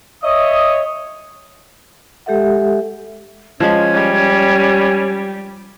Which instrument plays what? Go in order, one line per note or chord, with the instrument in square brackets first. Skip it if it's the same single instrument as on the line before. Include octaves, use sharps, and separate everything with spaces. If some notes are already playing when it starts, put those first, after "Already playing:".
[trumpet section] C#5 E5 D#6 [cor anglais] D#5
[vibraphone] G#3 G4 A4 E5 F#5
[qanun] F3 G#3 B5 [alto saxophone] C#4 [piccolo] G#6
[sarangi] G3